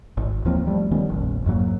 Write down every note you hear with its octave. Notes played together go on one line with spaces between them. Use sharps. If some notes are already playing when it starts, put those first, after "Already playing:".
G#1
D#2 F3 A#3 C4
F3 G3 A3
D#3 G3 B3 C#4
F1 A#1
F2 G#2 F#3 A#3